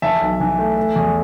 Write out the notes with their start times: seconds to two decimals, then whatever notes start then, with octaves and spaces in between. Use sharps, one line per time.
0.02 E3 E5 A5
0.22 B1
0.40 E3
0.59 A3
0.77 A3
0.96 E2